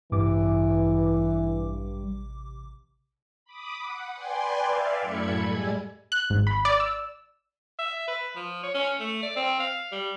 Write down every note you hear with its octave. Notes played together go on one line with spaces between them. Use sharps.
A1 G2 C3 E3 D6
B5 D6 D#6
F#5
B4 D5 G5 G#5 C6
D5 E5 F5
F#2 A2 A4 B5 G#6 C#7
G3 G#3 G#5
F#6
G#1
B5
D5
E6
E5
B4
F3
C#5
C#4
A3
D5
C4
F5
G3